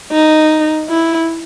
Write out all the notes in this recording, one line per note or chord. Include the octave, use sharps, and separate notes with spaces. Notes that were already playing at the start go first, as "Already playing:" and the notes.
D#4
E4